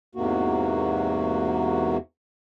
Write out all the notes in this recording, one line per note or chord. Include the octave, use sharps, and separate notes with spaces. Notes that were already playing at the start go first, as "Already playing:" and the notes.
E2 G#2 C3 A#3 F#4